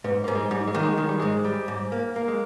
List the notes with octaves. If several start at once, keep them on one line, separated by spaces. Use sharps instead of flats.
G#2 B3
G#2 A#3
G#3
G#2 G3
G#3
D#3 A#3
G#3
D#3 G#3
G3
G#2 G#3
G3
G#2
A#3
A#3
G#3